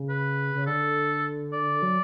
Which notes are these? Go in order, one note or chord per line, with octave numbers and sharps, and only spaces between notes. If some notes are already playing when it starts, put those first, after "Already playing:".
Already playing: C#3
B4
C#3
D3 A4
D5
F#3